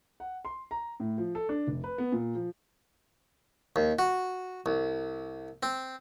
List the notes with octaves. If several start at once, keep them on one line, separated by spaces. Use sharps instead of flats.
F#5
C6
A#5
A2
F3
A4
D4
F1
B4
B3
A#2
F3
D#2
F#4
C2
C4